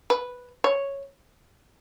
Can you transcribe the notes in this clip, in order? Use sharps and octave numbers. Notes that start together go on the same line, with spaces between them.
B4
C#5